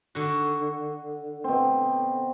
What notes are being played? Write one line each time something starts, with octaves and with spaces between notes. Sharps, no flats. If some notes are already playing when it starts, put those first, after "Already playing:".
D3 F#4
B2 C4